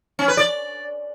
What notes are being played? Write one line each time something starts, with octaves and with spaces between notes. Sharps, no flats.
C#4
B4
D5